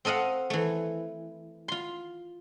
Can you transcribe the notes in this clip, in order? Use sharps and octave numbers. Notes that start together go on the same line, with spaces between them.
C4 A4 D#5 F5 F#5
E3 A3
F4 C6